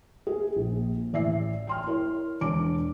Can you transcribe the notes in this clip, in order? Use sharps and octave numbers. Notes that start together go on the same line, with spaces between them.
G#4
A#1
A1 D5 E5 C7
G5 C6 F6
E4 A#4 C#5
E1 D4 C#5 D6 D7